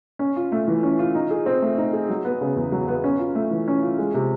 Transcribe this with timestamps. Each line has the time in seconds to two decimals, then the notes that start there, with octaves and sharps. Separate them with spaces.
0.19 C#4
0.36 F4
0.52 A3
0.68 E3
0.83 C#4
0.99 F4
1.15 D#4
1.31 G#4
1.46 C4
1.62 A3
1.78 D#4
1.93 G#4
2.09 F#3
2.25 B3
2.41 C#3
2.56 E2
2.72 F#3
2.88 B3
3.04 C#4
3.19 F4
3.35 A3
3.51 E3
3.68 C#4
3.83 F4
3.98 G#3
4.14 C3